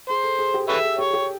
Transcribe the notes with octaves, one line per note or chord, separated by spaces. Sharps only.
G#4 C5
A4
G#4
G4
A4 B4 C#5 E5
A4
G4 C#5
G4